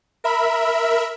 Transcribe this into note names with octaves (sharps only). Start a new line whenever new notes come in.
A#4 E5 B5